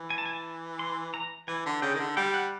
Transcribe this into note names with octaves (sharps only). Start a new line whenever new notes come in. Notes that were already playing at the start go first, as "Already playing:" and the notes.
Already playing: E3
G#5
A5
G#5
A5
C6
A#5
E3 G#5
D3
C#3 G5
D#3
D3
G3 G5
F#5